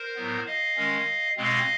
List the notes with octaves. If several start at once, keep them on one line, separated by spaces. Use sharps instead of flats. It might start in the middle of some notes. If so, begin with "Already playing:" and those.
Already playing: A#4 C5
A2 F#3 B3
D#5 F5
D#3 G#3 C#4
B2 G#3 C4 D#5 F5